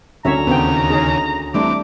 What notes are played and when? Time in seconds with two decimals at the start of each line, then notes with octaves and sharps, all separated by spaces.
0.25 D2 D3 C#4 C#5 E5 A#5
0.47 D#2 C#3 B3 C4 G5
0.90 C#4 D#4 G#4
1.54 E3 G3 A3 C4 D4 D6